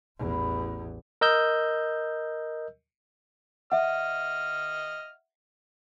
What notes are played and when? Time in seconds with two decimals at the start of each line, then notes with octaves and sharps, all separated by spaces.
0.18 A1 E2
1.21 A#4 D#5 E6 G6
3.72 D#5 E5 F#5 F6